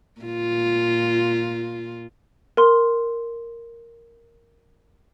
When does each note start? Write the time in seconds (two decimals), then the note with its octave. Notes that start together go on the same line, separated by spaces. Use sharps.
0.21 A#2 F4
2.57 A#4 C6